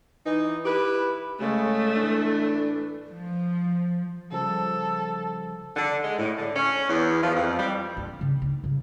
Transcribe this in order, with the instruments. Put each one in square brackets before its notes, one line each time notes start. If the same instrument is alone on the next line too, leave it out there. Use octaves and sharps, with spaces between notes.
[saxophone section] E3 D#4
E4 G4 B4
[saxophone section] C#3 G#3 [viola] A3
[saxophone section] A2 E3 D4
[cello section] F3
[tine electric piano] C#3 F3 G3 [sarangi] A4
[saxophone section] D3
G#3
A2
D3
C#4
E2
F3
F2
G3
[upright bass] D4
C#3
D#4
C#3